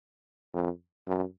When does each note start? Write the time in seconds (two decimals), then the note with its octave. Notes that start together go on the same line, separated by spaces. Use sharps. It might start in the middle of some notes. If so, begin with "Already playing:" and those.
0.54 F2
1.07 F#2